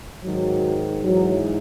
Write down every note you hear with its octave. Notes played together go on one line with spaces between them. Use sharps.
G#2 D#3 F#3
G#2 E3 F#3